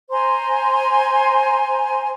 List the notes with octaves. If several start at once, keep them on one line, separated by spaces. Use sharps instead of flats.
C5 G#5 A#5 C6